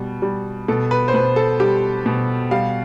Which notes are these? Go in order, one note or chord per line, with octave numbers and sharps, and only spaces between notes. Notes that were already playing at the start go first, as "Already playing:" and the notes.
Already playing: B2 G3
G3
B2 A4
B4
C5
B2 B4
A4
G3 G4
B2
G3 F5